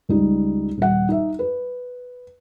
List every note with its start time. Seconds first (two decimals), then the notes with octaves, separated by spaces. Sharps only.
0.09 C#2 G3 D#4
0.78 D#1 F#5
1.09 D#4 E5
1.39 B4